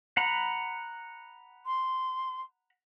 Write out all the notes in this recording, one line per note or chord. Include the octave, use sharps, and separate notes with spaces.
F#5 A#5 B5
C6